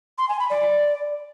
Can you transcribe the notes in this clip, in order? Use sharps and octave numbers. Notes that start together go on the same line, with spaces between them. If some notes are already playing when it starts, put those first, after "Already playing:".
C6
G#5
B5
D5